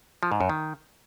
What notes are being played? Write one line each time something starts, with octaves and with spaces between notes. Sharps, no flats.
F3
G#2
F#2
D#3